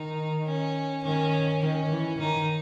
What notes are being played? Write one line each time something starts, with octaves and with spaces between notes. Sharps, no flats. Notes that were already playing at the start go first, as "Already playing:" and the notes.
Already playing: D#3 D#4
C#4
D#3 C#4
D#3 C#4
E3
D#3 D#4